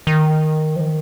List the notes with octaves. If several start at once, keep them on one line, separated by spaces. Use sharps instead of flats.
D#3
F3
D#3